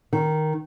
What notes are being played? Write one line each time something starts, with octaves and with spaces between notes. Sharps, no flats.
D#3